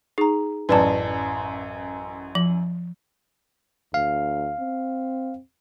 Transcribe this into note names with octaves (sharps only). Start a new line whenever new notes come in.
D#4 G#4 A#5
A1 F#2 B4 D5 A5
F3 F#7
D2 F5
C4